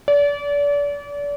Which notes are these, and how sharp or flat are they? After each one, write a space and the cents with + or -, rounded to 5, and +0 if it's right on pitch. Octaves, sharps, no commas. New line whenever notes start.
D5 -35